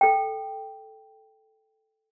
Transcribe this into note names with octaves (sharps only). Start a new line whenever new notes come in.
A4 G5